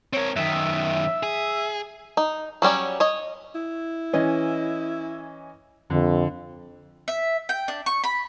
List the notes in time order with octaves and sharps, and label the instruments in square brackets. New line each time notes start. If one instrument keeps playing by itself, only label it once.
[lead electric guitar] C4 A#4 [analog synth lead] C#5
[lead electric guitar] F#2 D#3 [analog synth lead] E5
[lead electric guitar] G#4
[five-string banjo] D#4
F#3 G3 C#4 D5
C#5 D#5
[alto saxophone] E4
[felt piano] E3 C#4 D#5
[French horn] F2 [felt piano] D3
[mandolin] E5
G5
D4
C#6
B5